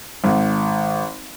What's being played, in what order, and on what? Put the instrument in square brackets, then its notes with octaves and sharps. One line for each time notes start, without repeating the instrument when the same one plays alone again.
[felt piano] G#1